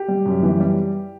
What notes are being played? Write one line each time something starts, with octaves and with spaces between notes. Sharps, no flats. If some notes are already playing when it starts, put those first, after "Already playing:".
Already playing: G4
G3
F#2
E3
G3